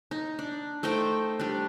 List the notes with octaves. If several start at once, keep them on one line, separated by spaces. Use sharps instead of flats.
D#4
D4
A3 D#4 C5 G5
G3 D4